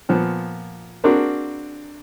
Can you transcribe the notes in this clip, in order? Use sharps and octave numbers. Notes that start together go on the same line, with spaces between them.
A#2 F3 B3
A#3 C4 D4 F#4 G#4 A#4